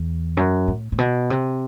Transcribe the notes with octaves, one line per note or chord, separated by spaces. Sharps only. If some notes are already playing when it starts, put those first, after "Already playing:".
Already playing: E2
F#2
A2
A2
B2
C3